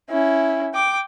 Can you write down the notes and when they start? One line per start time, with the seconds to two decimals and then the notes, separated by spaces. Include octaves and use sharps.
0.10 C#4 E4
0.74 G5 D6